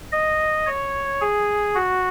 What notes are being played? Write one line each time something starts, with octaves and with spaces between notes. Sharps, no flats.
D#5
C#5
G#4
F#4